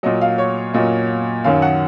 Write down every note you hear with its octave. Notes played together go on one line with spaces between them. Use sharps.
A#2 F#3 D#5
F5
C#5
A#2 F#3 D#5
F#2 D#3 F#3 F5
F#5